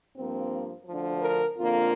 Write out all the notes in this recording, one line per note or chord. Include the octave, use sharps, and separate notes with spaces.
G2 F3 A#3 C4
D2 D3 F3
A#4
F2 D3 A#3 F4